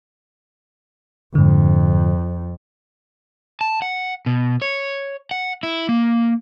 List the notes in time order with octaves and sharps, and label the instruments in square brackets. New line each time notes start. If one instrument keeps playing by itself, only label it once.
[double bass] F2 [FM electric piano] G#2 D3
[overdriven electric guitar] A5
F#5
B2
C#5
F#5
E4
A#3